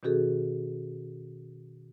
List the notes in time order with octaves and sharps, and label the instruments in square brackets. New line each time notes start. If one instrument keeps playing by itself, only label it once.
[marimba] B2 D#3 C#4 F#4 G#4 A4